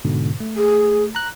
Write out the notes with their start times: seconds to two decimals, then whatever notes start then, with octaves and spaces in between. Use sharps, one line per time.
0.05 G#2 B2 D3
0.40 A3
0.57 G#4
1.15 A#5 F#6